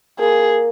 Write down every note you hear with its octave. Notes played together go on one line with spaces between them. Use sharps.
A#3 G#4